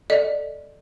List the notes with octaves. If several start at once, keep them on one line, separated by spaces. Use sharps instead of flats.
A4 D5 D#5